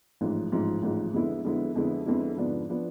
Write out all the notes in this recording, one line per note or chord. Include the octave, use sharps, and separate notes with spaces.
A1 G#2 F3
A1 G#2 F3
A1 G#2 F3
F2 D3 G#3 B3 E4
F2 D3 G#3 B3 E4
F2 D3 G#3 B3 E4
F2 D3 G#3 B3 E4
G#2 F3 B3 D4
F3 B3 D4